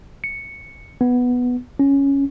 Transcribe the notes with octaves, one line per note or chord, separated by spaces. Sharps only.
C#7
B3
C#4